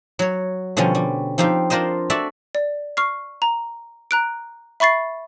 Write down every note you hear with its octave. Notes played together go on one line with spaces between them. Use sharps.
F#3 C#5
B2 D3 F3 G3 C#4
G3
F3 C4 D#4 G4 F5
D4 F4 A#4 C5 D#5
F#4 A4 D5 E5
D5
C#6 F6 C7
A#5
A#5 F#6 D7
E5 B5 C#6 A6 C7